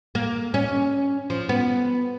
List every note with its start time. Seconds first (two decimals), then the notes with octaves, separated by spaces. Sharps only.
0.15 A#3
0.54 C#4
1.30 F3
1.49 B3